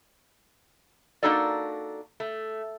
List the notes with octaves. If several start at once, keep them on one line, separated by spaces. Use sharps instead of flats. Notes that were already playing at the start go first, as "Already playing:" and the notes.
A#3 D4 D#4 F#4 A4 D5
A3